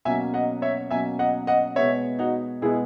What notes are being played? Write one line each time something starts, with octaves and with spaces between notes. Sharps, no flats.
B2 F#3 A#3 C#4 E5 G#5
D#5 F#5
C#5 E5
B2 F#3 A#3 C#4 E5 G#5
D#5 F#5
D#5 F#5
B2 G#3 B3 C#5 E5
D#4 F#4
B2 G#3 B3 E4 G#4